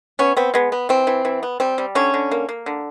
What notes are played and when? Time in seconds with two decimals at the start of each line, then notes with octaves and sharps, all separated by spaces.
0.19 B3 C#4
0.37 B3 C4
0.54 G#3 B3
0.72 B3
0.89 E3 C4
1.07 E3
1.25 E3
1.43 B3
1.60 G3 C4
1.78 G3
1.95 D3 C#4
2.14 D3
2.31 A#3
2.49 A#3
2.66 D3